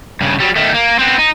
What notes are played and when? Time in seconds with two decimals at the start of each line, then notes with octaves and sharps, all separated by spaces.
0.21 G2 C#3
0.40 F#3 G3
0.56 D#3 A3
0.75 A#3
0.99 B3 C4
1.19 D#4